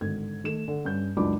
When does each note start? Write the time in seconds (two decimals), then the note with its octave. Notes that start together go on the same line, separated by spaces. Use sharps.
0.01 G#1 D3 G#6
0.44 D#3 A3 E7
0.68 D3
0.85 G2 C#4 G6
1.17 C#2 F#2 D4 D#4 B5 D6